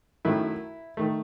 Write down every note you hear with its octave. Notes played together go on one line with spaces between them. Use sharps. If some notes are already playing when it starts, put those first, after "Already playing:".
F#2 D#3 A3 E4
D#3 A3